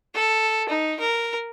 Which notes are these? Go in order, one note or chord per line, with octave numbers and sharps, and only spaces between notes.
A4
D#4
A#4